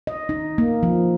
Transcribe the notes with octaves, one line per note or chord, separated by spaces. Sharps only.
D#5
D#4
A#3
F3